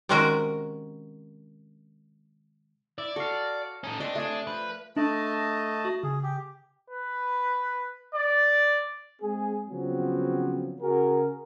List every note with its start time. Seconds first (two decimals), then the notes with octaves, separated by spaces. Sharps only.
0.09 C3 D#3 G#3 C#4 F#4 A#4
2.98 E4 D5
3.16 F#4 A4 F5
3.84 C#4 D#4 A4
4.00 A3 C4 D4 D#5
4.15 C3 A3 G#4 D5
4.47 F3 B4
4.96 A3 D4 D#5 A5
5.85 F#4
6.03 C#3 G#4
6.23 G4
6.90 B4
8.15 D5
9.21 G#3 C4 G#4
9.70 C#3 F3 F#3 B3 C4
10.81 C#3 F#4 G#4 A#4